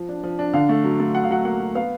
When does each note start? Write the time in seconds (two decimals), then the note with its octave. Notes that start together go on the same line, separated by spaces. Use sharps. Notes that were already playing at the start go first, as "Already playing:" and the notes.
Already playing: F3
0.09 D4
0.23 F3
0.39 D4
0.54 D3 F5
0.69 A3
0.84 F#3
1.00 A3
1.14 F#3 F#5
1.24 F5
1.30 F#3 F#5
1.45 A#3 F#5
1.60 F#3
1.75 B3 F5